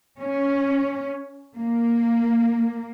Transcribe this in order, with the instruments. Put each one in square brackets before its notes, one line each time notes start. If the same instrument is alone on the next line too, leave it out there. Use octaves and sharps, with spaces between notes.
[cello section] C#4
A#3